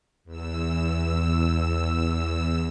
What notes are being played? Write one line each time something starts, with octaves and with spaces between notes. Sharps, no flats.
E2 E6